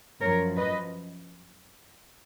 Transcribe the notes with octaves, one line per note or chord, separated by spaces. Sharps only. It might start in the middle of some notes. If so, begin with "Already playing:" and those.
F#2 F3 A#4 C#5
B4 D#5